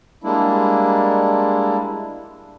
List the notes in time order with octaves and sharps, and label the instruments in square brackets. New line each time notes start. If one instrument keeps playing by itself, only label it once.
[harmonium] G3 G#3 A#3 D4 E4